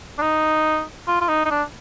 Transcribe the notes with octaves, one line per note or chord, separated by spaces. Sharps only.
D4
D#4
F4
F4
D#4
D#4
D4